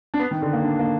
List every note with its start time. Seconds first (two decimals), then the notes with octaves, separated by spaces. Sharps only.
0.14 D4
0.19 B3
0.31 D#3
0.42 D3
0.53 A#3
0.64 D4
0.79 A#3